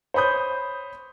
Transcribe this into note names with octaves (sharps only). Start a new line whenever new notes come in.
C5 C#5 B5 D#6 G6